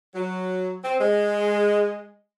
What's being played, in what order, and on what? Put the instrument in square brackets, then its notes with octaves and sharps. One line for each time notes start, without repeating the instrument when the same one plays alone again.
[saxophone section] F#3
C4
G#3